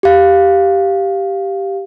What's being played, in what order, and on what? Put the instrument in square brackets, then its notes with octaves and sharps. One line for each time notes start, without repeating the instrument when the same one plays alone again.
[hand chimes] G4 F5